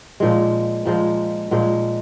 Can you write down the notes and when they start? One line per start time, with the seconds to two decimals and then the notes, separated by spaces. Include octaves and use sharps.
0.20 A#2 F3 G#3
0.85 A#2 F3 G#3
1.51 A#2 F3 G#3